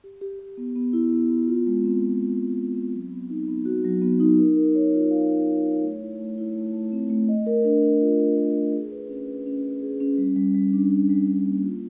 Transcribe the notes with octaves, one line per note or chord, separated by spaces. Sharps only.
G4
G4
G4
B3
B3
E4
B3
B3
F4
G#3
C4
F4
F4
G#3
G#3
C4
F#3
B3
D#4
B3
F#4
F#3
B3
D#4
A#4
A#4
C#5
F4
F5
C#5
C#5
C#5
A3
E4
A3
E4
A3
A3
C4
A3
D#5
A#4
D4
D4
F4
F4
A#4
F4
G#4
B4
C#4
B4
C#4
C#4
G#4
C#4
G3
G3
G3
D4
D4
G3
D4
A#3
F4